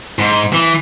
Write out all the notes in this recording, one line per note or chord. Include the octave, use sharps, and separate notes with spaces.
G#2
E3